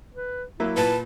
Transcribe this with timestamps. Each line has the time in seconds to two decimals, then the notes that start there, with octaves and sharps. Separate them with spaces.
0.14 B4
0.60 F#3 A#3 E4 E5
0.77 A#2 B4 A5